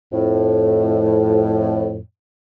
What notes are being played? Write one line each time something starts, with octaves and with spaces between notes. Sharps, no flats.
F2 A2